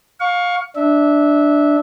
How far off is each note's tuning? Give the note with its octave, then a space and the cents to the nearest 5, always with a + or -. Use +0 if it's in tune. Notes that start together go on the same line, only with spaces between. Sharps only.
F5 +25 C#6 +10
D4 +0 E5 -20